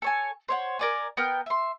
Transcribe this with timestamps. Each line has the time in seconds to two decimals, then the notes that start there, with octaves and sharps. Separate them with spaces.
0.02 A4 C#5 G#5
0.48 C5 C#5 F#5
0.79 A#4 D5 G#5
1.17 B3 A#4 G5 F6
1.46 E5 C6